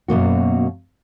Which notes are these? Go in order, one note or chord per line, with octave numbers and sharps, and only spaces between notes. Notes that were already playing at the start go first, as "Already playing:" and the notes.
F#2 B2 A#3 F#4